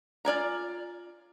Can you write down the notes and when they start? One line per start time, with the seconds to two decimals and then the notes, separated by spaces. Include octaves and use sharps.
0.25 F4 D5 G#5 A#5